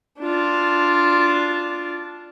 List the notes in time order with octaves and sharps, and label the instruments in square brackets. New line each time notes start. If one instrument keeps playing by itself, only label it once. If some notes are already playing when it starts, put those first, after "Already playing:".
[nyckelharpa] D4 F4